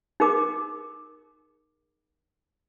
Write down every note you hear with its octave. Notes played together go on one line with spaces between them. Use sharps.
D#4 G#4 A#4 D6